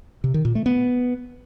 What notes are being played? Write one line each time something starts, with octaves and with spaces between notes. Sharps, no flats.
C3
D#3
A#2
A3
B3